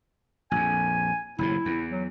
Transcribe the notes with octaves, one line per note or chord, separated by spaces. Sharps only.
A#1 F2 G#5
F#1 D#2 A2 E4
E2
F#3